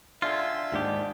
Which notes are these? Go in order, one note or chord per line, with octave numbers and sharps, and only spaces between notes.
D3 F4 G#4 E5
D#2 G#2 D4 G4